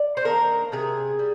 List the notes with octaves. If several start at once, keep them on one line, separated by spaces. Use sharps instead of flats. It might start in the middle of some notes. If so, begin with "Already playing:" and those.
Already playing: D5
C5
D#3 A#3 D4 A#4
C3 G#4
G3